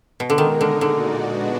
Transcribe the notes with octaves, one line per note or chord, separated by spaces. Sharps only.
B2
D3
D#3 G#3 D#4 A#4
D3
A#2 D3 G#3 D#4 F#4 D5
G#3 B3 D4 F#4